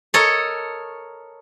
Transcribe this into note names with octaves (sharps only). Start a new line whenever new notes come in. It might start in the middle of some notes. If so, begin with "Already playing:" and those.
A4 A#4 C#5 D#5